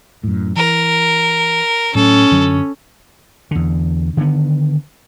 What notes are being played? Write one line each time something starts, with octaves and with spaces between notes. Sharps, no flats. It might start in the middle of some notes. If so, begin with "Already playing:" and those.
F#2 A2
E3 A#4
A2 F#3 C#4 A4
F#2 D3 F#3
E2 D3
D3 D#3 B3